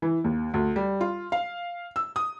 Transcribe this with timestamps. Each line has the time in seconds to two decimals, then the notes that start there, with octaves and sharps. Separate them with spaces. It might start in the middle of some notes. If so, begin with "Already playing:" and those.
0.02 E3
0.24 D#2
0.54 D2
0.76 G3
1.01 F4
1.32 F5
1.96 E6
2.16 D#6